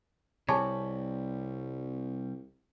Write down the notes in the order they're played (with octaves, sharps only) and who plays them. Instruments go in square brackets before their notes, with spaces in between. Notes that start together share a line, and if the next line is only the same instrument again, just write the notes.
[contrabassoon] C2 [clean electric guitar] C3 G3 [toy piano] G#4 G#5 A5 [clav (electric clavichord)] C#5